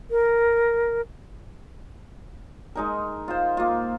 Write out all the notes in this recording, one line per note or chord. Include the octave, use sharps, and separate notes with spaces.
A#4
G#3 D#4 A#4
F4 C5
A#3 F4